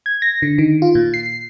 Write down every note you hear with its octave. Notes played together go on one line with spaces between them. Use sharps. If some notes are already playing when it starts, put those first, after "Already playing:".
G#6
A#6
D3
D#3
F4
A#2
C7